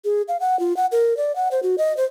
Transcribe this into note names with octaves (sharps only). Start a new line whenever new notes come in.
G#4
F5
F#5
F4
F#5
A#4
D5
F#5
C5
F#4
D#5
C5